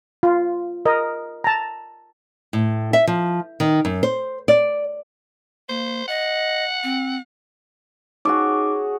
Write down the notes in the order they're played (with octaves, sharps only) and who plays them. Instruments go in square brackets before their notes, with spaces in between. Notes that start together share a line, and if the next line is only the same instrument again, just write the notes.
[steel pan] F4
A#4 D#5
A5 A#5
[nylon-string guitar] A2
E5
F3
D#3
F#2
C5
D5
[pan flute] A#3 [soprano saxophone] C5
[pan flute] D#5 [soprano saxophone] F#5
[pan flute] C4
[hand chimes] D#4 D6 [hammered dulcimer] F#4 G#4 C#5